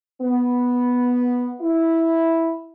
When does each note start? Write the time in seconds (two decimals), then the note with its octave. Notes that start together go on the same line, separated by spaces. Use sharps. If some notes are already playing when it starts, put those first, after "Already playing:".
0.21 B3
1.60 E4